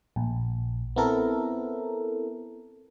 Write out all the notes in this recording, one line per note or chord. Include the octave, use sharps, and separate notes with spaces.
A#1
B3 C4 E4 A4 A#4